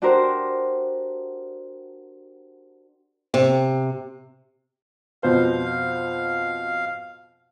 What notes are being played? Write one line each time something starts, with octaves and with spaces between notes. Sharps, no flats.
D4 F#4 G4 A#4 C5
C3
F2 B2 C5 F5